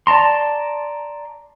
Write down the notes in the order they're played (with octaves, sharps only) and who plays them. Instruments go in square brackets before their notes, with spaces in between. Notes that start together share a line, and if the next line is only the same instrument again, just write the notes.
[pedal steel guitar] D5 A5 A#5 C6